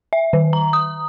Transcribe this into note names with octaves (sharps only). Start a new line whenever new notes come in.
E5
D#3
A#5
D#6